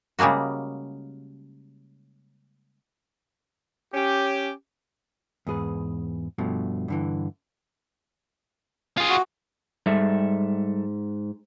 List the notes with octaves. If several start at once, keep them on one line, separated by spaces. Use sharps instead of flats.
C#3 G3 G#3 A#3 F#4
C#4 G4
E2 G#2 G#4 B4
G2 B2 F3 A3
G2 D3 E3
F4 G#4
F#4
G#2 G3 A4 E5